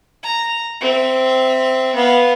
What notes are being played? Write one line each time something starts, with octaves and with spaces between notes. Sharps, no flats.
A#5
C4 E5
B3 F5